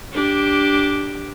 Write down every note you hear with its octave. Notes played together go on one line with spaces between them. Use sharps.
D4 G4